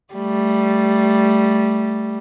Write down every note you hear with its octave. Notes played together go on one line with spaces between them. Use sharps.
G3 A3